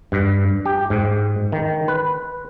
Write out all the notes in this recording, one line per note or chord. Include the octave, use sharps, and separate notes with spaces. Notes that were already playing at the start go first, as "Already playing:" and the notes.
G2
G4
G#2
D#3
B4